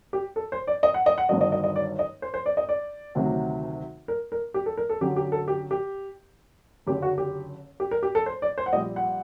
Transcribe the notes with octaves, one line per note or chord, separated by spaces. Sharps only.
G4
A4
C5
D5
D#5
F#5
D#5
F#5
G1 G2 D#3 F#3 D#5
D#5
D#5
D#5
D5
D#5
C5
C5
D5
D#5
D5
D2 C3 D#3 F#3
A#4
A#4
G4
A4
A#4
A4
F#2 D3 F#3 G4
G4
A4
G4
G4
F#1 F#2 D3 G4
F#4
G4
G4
A#4
G4
A4
C5
D5
C5
F#5
A#1 A#2 G3 D#5
F#5